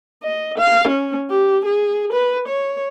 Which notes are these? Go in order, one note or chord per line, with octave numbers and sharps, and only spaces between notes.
D#5
F5
C#4
G4
G#4
B4
C#5